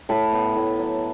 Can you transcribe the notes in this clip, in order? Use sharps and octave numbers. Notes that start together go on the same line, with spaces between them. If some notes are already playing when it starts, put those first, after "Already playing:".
A2 A5 B5
B3
A2
F#3